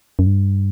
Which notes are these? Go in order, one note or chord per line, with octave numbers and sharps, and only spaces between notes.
F#2
G2